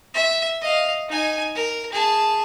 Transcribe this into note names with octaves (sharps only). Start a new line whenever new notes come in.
E5
D#5 F5
D#4 G#5
A#4
G#4 A5